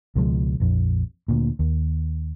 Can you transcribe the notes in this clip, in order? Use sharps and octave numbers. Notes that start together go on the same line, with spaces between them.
C#2 B2 F3 G#3
A#1 F2
D2 A#2
D#2